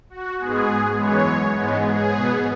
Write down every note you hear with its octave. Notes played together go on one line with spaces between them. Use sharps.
F#4
G#2 G#3 B3 G#4
F#2 E3 G#3 B3 C#5
G#2 G#3 B3
G#4
B2 B3